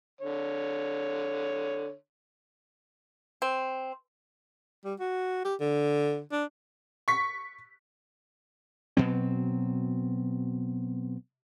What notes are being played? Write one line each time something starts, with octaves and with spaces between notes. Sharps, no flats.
D3 C#5
C4
G3
F#4
G4
D3
D4
C#6 B6
B2 F#3 C4